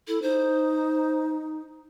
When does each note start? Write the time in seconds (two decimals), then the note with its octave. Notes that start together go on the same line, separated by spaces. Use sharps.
0.08 E4 A4
0.22 D#4 C5